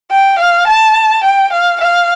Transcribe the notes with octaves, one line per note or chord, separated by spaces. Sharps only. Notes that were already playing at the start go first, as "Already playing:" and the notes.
G5
F5
A5
G5
F5
F5